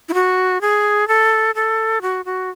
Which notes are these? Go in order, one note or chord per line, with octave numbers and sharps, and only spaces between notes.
E4
F#4
G#4
A4
A4
F#4
F#4